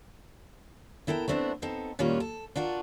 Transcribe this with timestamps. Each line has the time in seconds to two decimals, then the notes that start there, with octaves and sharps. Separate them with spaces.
1.07 B3 E4 A4 A#4 G5
1.28 A3 B3 C4 D4 E4
1.62 B3 C4 D#4 A4
1.99 A#2 D#3 G3 C#4 F4 F#4
2.20 A4
2.55 D4 F4 F#4 A#4